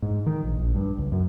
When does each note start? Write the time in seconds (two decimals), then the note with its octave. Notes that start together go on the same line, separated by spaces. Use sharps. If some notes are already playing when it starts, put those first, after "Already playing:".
0.02 G#2
0.27 D#3
0.44 A#1
0.59 A#1
0.75 G2
0.98 C#2
1.12 F#2